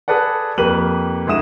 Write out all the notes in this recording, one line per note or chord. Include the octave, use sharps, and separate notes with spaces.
G#4 A4 B4 D5 F#5
F2 A#3 G4 B4 D#7 F#7
D2 G#3 E4 D#6 E7